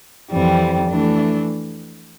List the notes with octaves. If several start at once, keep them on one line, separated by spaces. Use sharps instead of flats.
F2 E3 G3 C4
E3 A3 D4